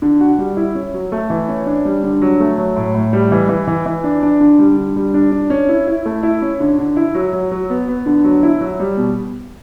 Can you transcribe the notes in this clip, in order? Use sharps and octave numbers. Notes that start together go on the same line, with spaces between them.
D3
F#4
G3
E4
C#4
F#3
A3
E3
C#4
D4
G3
D3
F#3
A3
F#3
A2
A2
G3
E3
E3
E3
E3
D4
D4
D3
G3
D3
G3
D4
D4
C#4
E4
E4
A3
E4
C#4
D3
D3
E4
F#3
F#3
F#3
B3
B3
D3
F#3
E4
F#3
G3
B2